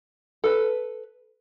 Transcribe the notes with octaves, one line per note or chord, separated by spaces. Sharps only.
A4 B4